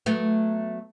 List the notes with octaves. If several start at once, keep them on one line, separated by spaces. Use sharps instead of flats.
F#3 A3 B3